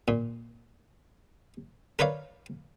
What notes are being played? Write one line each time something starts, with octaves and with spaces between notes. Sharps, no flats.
A#2
A#4 B4 C#5 D5 F5